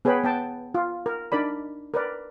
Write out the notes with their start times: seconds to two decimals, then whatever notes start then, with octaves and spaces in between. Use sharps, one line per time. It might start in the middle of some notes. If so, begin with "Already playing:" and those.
0.05 B3 G#4 B4 C#5 G5 B5
0.24 B3 G5 A5
0.74 F4
1.06 A#4
1.32 D4 D#4 A#4 D5 B5
1.94 A#4 B4 D5